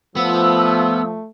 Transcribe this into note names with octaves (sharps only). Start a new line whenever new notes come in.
F3 A3 B3 E6